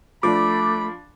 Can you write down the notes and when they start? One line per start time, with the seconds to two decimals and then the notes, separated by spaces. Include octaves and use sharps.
0.23 F3 A3 D4 B5 D6